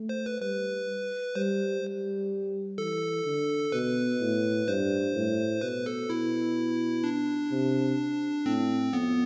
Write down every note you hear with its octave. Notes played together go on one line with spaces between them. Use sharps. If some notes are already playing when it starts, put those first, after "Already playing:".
Already playing: A3
C5
B4
G3 B4
G3 C5
G3
E3 A4
D3
B2 B4
A2
G2 C5
A2
B2 B4
A4
B2 E4
D4
C3
A2 C4
F2 B3